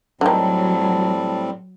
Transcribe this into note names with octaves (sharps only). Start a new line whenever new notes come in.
A2 D3 D#3 F#3 G3 C4 A5